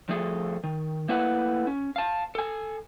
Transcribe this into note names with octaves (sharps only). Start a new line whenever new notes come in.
F2 F3 A3 G#4 A4
D#3
A3 A#3 E4 B4 F#5
C#4
F5 A5
A4 G#5